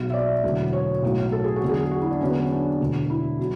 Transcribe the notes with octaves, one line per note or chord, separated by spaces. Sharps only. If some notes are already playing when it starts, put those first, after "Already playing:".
Already playing: B1 B2 F#3
E5
D5
E1 D2 D3 F#3
C#5
B1 A2 F#3
A4
G#4
F#4
E2 D3 F#3
G#4
F#4
E4
D4
E2 D3 F#3 C#4
B3
C#4
D4
E1 D2 D3
E4
B2 F#3